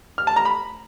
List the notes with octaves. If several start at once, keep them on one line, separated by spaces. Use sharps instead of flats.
F6
A5
A#5
B5